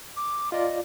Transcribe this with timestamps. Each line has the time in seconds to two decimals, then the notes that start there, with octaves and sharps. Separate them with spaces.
0.16 D6
0.52 F4 D5 D#5